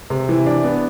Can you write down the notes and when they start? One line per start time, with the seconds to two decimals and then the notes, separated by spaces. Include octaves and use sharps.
0.10 C3
0.29 E3
0.46 D4
0.64 B3